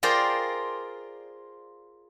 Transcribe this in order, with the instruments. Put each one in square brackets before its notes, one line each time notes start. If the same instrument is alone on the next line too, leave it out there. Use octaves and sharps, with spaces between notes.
[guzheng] F4 G#4 A#4 C5 D5 G5